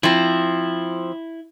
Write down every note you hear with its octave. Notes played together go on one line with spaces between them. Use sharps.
F3 C4 E4